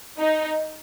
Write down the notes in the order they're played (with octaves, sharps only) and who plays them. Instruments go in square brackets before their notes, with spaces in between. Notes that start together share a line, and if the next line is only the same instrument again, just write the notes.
[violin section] D#4